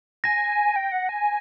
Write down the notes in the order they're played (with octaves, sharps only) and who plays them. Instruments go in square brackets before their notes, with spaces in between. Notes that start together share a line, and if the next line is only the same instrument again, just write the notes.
[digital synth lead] G#5 [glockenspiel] A#6
[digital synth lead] G5
F#5
G#5